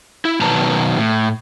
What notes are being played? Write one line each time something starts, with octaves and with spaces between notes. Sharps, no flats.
E4
B2 D#3 F#3 B4 A5 A#5
A2